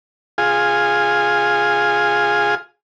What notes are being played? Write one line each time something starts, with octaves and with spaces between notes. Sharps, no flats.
F4 G#4